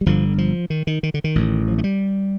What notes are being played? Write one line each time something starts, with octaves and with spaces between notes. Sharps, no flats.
G3
G1 G2 D3 F3
F3
D#3
D#3
D#3
D3
D#3
A1 A2
F3
A3
G3